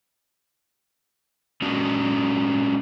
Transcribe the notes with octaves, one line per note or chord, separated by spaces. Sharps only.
G#3 C#4 D4 F#4